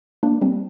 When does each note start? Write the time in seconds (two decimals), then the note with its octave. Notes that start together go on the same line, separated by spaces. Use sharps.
0.23 A#3 D4
0.41 G3 C4